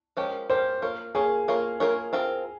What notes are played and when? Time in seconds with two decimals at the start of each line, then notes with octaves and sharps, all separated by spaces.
0.17 F3 G#3 C#4 G4 A#4
0.49 F3 G#3 C#4 G4 A#4 C5
0.82 A#3 F4 A#4 C#5
1.15 A#3 F4 G#4 A#4 C#5
1.48 A#3 F4 A#4 C#5
1.80 A#3 F4 A#4 C#5
2.13 C4 F4 A#4